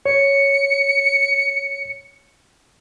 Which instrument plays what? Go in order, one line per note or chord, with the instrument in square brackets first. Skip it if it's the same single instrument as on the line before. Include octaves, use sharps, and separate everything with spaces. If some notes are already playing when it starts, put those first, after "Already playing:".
[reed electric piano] C#5 [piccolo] C#7